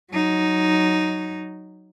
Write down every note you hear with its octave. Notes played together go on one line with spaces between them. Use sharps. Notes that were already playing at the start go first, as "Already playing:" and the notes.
F#3 D#4